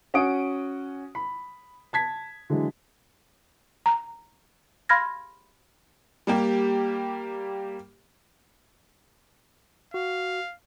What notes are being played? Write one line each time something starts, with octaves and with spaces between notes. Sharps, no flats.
C#4 F#4 F#5 C#6 D#6 D7
B5
A5 G#6 B6
D3 E3 F#3 G#3
A#5
F5 B5 C6 F6 G#6 A#6
G3 A#3 G4
F#4 F5